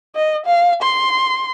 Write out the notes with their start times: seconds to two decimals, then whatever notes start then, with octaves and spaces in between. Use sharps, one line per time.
0.15 D#5
0.46 F5
0.82 C6